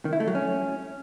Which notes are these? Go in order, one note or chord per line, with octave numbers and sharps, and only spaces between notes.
D#3
E4
A3
F#3
C#4